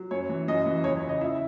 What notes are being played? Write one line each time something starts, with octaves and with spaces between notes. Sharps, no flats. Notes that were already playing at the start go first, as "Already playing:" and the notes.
Already playing: F#3
F#2 C#5
E3
F#2 D#5
E3
E2 C#5
C#5
C#3
D#5
C#3 E4 E5